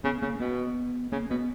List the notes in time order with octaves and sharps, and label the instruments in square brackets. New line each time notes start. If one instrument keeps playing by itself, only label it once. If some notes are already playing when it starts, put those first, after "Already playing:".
[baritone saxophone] C#3 [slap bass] B3
[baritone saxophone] C#3 [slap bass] A#3
[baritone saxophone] B2 [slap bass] B3
[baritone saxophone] C#3 [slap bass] A#3
[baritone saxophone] B2 [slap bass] B3